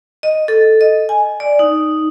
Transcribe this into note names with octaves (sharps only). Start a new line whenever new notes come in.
D#5
A4
D#5
G#5
D5
D#4